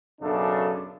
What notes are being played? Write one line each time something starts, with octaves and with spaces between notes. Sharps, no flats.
B1 F#2 C#3 D4 A4